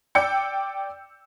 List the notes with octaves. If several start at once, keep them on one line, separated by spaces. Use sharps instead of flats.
D5 G5 D6 E6 G6 C#7